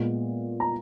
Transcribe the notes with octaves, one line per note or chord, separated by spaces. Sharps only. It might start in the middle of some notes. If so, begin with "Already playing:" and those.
Already playing: A#2 G#3 B3
A#5